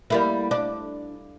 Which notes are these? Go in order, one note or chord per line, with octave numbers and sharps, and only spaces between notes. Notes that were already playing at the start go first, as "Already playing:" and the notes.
G3 A#3 E4
D4